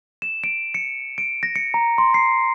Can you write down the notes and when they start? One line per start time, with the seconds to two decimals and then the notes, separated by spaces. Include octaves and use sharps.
0.22 E7
0.44 D7
0.74 C#7
1.18 D7
1.43 A#6
1.56 C#7
1.74 A#5
1.98 C6
2.14 C7